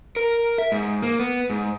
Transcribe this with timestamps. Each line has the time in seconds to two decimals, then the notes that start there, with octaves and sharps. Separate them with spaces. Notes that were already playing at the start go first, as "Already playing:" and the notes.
0.16 A#4
0.58 E5
0.72 G#2
1.02 A#3
1.19 B3
1.50 G#2